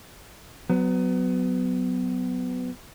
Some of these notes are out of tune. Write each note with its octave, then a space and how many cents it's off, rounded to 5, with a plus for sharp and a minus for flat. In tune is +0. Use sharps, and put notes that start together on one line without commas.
F#3 +0 B3 +25